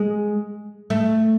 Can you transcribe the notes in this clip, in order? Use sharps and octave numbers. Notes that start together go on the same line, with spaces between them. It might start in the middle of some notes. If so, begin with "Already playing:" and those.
Already playing: G#3
A3